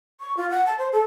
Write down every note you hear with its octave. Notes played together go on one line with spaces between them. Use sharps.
C#6
F4
F#5
A5
C5
A4